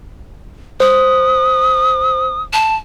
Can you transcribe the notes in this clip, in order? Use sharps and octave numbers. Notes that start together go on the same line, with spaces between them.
C5 D#6
A5